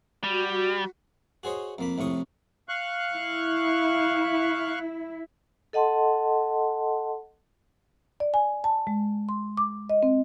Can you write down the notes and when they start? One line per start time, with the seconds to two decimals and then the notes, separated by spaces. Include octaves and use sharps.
0.24 G3 F#4
1.43 F#4 G#4 C5 C#5 D#5
1.78 F2 A#3 B5
1.98 C2 F2 A2 C#6 D#6
2.69 F5 C#6 F#6
3.11 E4
5.73 A4 D#5 F#5 A5 C6
8.20 D5
8.34 G#5
8.64 A5
8.87 G#3
9.29 C6
9.57 D6
9.90 D#5
10.03 C4